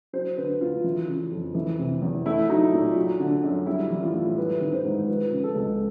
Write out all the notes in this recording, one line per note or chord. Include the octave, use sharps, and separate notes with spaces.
F#3 C5
D3 B4
D2 F4
E3
C#3
F2
E3
C3
E2
A3 E4
F#3 D#4
A#2
F#3
D3
F#2
G3 E4
E3
F4
A2
G3 B4
D#3
C5
G#2
F3 B4
C#3
A4
C#2